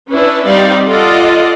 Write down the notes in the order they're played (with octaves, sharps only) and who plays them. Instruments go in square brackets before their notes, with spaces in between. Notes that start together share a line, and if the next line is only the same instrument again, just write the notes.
[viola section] C#4 D4 E4 B4
G3 C4 D#4 D5 F5
F4 A4 D5 D#5 F5 F#5